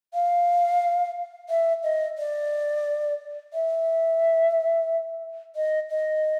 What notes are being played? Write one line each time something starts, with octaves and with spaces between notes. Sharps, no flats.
F5
E5
D#5
D5
E5
D#5
D#5